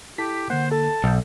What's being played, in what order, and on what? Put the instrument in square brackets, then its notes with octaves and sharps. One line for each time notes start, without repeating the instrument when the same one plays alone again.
[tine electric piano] E4 A4 A5 [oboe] G4 [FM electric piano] B6
[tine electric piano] D3 A#3 [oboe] C5 [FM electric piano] F#5
[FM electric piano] A4 [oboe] A5
[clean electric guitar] B1 [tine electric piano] F#5 G6